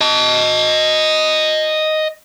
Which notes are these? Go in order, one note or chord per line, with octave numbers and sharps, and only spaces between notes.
D#5 A5